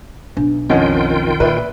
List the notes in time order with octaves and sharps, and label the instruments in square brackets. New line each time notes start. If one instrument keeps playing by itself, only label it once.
[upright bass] B1 [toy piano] D4
[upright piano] F2 C#4 [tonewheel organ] D#3 F4 G5 [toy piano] D#5 F#5
[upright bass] A#2 [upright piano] B4 D5 E5